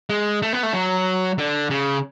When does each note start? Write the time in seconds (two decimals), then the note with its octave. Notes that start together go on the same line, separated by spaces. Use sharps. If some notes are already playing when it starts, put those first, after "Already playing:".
0.10 G#3
0.42 A3
0.53 B3
0.63 A3
0.73 F#3
1.38 D3
1.70 C#3